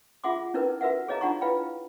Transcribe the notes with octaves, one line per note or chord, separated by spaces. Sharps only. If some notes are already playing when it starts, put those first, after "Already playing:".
F4 G#4 E5 F#5 C6 D6
C#4 D#4 E4 A#4 B4
F#4 A#4 B4 E5 F#5
G#4 C#5 D#5 F5 A#5
D4 D#4 F4 F#5 A#5 C#6
E4 B4 F5 G5 B5